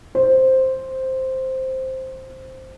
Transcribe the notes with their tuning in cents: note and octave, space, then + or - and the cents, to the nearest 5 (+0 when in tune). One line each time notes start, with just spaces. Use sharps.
C5 +0